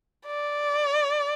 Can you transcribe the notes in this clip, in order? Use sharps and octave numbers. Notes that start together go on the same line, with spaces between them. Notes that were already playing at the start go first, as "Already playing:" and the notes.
D5